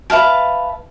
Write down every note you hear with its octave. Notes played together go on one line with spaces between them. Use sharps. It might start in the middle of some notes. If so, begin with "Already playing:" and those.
B4 E5 F5 A5